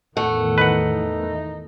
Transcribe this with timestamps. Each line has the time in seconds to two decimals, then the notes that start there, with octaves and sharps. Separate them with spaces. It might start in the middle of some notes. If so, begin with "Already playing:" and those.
0.17 E2 A2 D#3 A3 F#5
0.58 D#4 B4 F#5